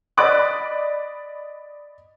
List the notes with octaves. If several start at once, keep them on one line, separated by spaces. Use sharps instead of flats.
D5 D#5 B5 D6 F#6